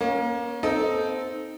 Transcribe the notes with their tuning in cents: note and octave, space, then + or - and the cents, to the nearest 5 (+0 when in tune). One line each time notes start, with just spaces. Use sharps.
A#3 +30 C#4 +0
C4 -10 D#4 +0 A4 -15